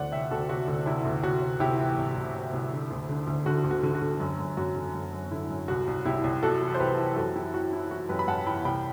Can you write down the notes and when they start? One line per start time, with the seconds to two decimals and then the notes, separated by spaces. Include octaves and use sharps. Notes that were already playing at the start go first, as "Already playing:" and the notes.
Already playing: D2 E3 D5 F#5
0.12 C3 E5 G5
0.31 D2 F#4 A4
0.49 C3 F#4
0.68 D2
0.86 C3 E4
1.05 D2
1.23 C3 F#4
1.42 C3
1.60 C3 E4 G4
1.79 E3
1.98 C2
2.16 C2
2.35 C3
2.53 C2
2.71 D3
2.91 D2
3.09 D3
3.27 D2
3.46 D3 F#4
3.64 D2
3.71 F#4
3.83 D3
3.95 F#4
4.02 D3
4.20 F#2
4.39 F#2
4.57 F#2 F#4
4.76 D3
4.94 F#2
5.13 F#2
5.31 D3 E4
5.50 F#2
5.68 C2 F#4
5.87 C2
6.05 C2 E4 G4
6.24 C2
6.43 C3 F#4 A4
6.61 E3
6.74 C5
6.80 C2 G4 B4
6.98 E3
7.16 F#2 F#4 A4
7.35 E3 E4 G4
7.54 E3 F#4
7.72 E3 E4
7.91 E3 F#4
8.09 F#2 G4 B4
8.19 B5
8.28 F#2 F#5 A5
8.46 E3 G5 B5
8.65 C2 G5 B5